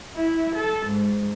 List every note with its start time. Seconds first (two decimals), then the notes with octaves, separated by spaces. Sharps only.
0.15 E4
0.55 A4
0.86 G#2